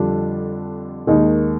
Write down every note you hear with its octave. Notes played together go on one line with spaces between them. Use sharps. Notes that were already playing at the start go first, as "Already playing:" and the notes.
Already playing: F2 D3 G3 D4 F4
D#2 D#3 G#3 D#4